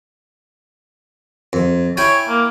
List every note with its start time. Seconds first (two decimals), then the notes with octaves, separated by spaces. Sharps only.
1.53 F2
1.97 E4 C#5 G5 G#5
2.28 A#3